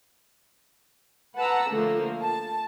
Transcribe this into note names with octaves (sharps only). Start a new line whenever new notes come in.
B4 F#5 A5 A#5 E6
D3 F3 A3 A#3
A5